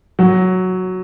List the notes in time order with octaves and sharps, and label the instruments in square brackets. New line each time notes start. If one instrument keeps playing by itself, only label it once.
[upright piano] F#3